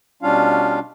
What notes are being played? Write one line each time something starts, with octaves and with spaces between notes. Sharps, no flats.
B2 G3 C#4 D4 F4 F5